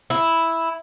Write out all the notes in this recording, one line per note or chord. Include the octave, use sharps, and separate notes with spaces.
E4